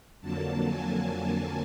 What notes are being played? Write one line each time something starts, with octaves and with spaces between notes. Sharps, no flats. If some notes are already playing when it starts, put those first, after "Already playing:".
F2 D3 F#3 A#3 A5
G#5